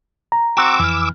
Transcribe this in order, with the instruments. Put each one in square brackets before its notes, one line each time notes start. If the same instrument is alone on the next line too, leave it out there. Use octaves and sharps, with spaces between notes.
[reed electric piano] A#5
[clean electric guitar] C4 F#4 [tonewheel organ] D6 E6
[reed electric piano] F2 F6 [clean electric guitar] E3